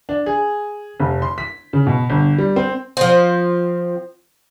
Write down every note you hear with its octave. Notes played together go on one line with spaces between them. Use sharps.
D4
G#4
F1
C6
B6
C#3
B2
G1
G3
C4
F3 C4